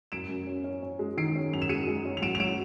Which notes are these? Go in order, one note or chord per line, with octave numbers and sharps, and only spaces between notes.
F#2 D7 E7
F#2
C#4
C#4
C#4
G#3
D#3 C7 D7
C#4
F#2 F7
E7
G#3 C#7 D#7
G#3
C#4
F7
F#3 D7 E7
F7
F#3 D7 E7